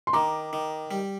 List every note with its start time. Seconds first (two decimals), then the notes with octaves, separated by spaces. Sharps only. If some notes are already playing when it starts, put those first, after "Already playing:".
0.07 C6
0.13 D#3 A#5 D6
0.53 D#3
0.91 G3